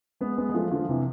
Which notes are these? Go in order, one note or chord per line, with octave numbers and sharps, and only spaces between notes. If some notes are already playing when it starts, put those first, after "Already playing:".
G#3 B3
G#3 B3
G#3
F3 A3
D3 F3
C3 E3